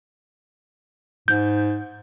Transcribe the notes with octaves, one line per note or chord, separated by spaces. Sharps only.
G#2 G6